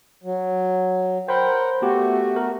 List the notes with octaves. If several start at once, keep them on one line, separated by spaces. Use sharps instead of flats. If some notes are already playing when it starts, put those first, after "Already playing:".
F#3
A#4 C5 F#5 G5 B5
A3 B3 F#4 G4
A#4